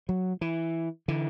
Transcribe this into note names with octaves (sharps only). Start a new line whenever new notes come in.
F#3
E3
D3 E3